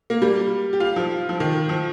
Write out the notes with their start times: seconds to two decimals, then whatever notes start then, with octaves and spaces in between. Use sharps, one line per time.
0.10 A#3
0.22 G3
0.73 G4
0.80 F4
0.96 F3
1.29 F3
1.40 D#3
1.69 F3